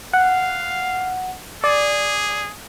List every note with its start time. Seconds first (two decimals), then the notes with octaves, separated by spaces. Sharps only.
0.13 F5 F#5
1.64 G#4 D5